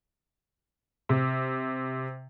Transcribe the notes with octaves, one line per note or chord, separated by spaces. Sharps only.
C3